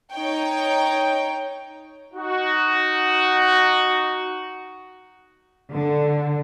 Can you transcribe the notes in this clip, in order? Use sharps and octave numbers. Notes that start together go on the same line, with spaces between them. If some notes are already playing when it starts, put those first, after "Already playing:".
D#4 C#5 G5
D#4 F#4
D3